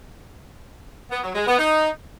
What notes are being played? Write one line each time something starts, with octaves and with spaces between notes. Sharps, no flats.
B3
F#3
G#3
B3
D#4